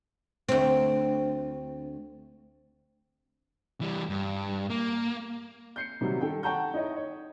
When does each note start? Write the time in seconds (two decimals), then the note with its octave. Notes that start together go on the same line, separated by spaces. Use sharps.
0.49 D2 C4
3.81 E3 G3
4.09 G2
4.70 A#3
5.76 G6 C7 C#7
6.01 C3 D#3 F#3 G3
6.21 D#3 A4 G5
6.43 F#5 G5 A5 A#5 C#6 G6
6.74 D#4 E4 C#5 D#5
6.96 C#5